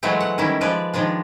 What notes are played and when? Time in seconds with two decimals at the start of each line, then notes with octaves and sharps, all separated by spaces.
0.03 E3 F#3 G#3 A3 C4
0.20 F#5
0.38 D#3 G3 C#4 E4
0.61 F3 G#3 B4 D5
0.93 D#3 F3 G#3 D4